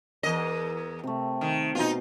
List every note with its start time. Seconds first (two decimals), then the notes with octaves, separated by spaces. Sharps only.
0.23 E2 A#4 D#5
1.03 C3 A3
1.41 D#3
1.75 B2 D#4 F4